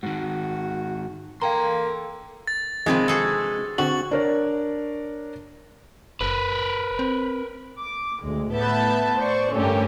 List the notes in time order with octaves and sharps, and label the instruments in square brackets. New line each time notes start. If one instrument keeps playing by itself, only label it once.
[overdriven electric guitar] G#2 D#3 [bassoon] F#4
[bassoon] A#3 [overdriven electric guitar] A4 C6 [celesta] F5 G5 A#5
[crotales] A6
[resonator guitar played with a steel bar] C3 G#3 [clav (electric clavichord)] D#3 F3 C4 [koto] D4 B4
[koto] F#4 G#4 A4
[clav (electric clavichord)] D3 C4 D4 [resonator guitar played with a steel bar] F#4 [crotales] F#7
[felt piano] D4 A#4 C#5
[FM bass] F#1 [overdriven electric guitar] A#4 B4
[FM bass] C4
[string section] D6
D2 G#3
A2 B3 B4 E5 A5 G6
C5 D5 C#6
G2 D3 A3 C#4 G4 A#4